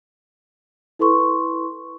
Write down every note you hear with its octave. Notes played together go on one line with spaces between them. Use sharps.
E4 A4 B4 C6 C#6